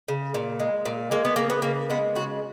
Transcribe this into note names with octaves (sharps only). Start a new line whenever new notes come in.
C#3
A#2
G#3
A#2
G#3 A#3
B3
C#3 A#3
B3
C#3 A#3
G#3 B3
C#3 F#4